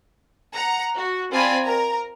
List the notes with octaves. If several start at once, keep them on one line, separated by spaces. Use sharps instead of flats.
F#5 A#5
F#4
C4 F4 D5 G#5 A5 B5
A#4 A#5